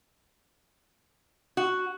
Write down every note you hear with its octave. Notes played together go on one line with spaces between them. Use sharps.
F#4